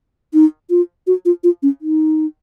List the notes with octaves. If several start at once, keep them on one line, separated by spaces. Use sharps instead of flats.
D#4
F4
F#4
F4
F4
C#4
D#4